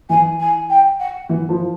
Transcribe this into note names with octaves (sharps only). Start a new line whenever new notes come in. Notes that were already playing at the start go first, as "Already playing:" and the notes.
E3 G#5
G#5
G5
F#5
E3
F3